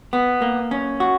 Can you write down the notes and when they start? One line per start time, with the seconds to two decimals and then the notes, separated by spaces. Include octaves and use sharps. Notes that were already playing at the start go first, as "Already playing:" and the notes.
0.13 B3
0.42 A#3
0.71 C#4
1.00 F#4